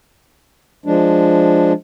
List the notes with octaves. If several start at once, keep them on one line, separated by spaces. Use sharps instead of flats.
F3 G#3 D4